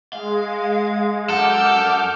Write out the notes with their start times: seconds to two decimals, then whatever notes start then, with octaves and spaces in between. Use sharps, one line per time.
0.13 G#3 F5
1.30 F#2 A4 F#5 D6 F6 G6